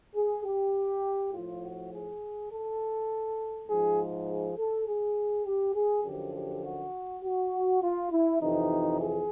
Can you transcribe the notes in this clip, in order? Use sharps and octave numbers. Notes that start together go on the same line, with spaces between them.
G#4
G4
A2 F3 F4
F#4
G#4
A4
G#2 F3 G#4
G#4
A4
G#4
G4
G#4
F#2 D3 F3 G4
G4
F#4
F#4
F4
E4
F2 C3 E3 D#4
G#4